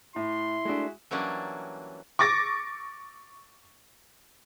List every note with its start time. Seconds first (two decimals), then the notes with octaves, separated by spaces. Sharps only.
0.16 A2 E4 C6
0.65 G#3 A3 D4 F#4 E5
1.11 E3 F#3 G3 A#3 C#4 D4
2.19 C#6 D6 A6 A#6